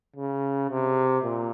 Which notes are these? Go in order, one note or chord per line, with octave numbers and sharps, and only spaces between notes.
C#3
C3
A#2